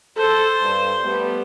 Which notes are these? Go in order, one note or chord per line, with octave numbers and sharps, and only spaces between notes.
A4 C5
G2
G3 A3 B3